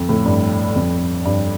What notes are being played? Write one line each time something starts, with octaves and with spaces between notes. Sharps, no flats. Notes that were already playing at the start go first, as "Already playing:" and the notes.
Already playing: F2
A2
G2
F2
G2